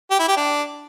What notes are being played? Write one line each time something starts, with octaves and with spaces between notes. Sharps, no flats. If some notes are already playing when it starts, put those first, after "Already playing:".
G4
E4
G4
D4